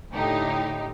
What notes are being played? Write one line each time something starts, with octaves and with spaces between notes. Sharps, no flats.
A2 D3 D#4 G4